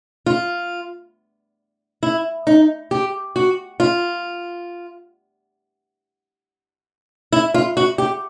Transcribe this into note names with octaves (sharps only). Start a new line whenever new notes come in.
F4
E4
D#4
G4
F#4
F4
E4
F4
F#4
G4